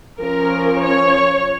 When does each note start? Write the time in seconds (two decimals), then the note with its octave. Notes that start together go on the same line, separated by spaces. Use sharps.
0.19 F3 C#4 A#4
0.82 C#5